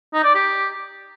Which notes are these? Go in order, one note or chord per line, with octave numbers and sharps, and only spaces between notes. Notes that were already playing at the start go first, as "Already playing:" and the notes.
D#4
D5
G4